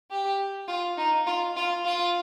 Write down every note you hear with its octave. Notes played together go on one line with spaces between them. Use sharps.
G4
F4
D#4
F4
F4
F4